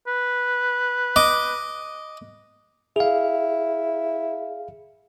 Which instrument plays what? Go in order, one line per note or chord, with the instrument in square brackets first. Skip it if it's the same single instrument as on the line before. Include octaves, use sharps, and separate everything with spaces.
[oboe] B4
[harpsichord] D#5 D6
[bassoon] E4 [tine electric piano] G#4 F5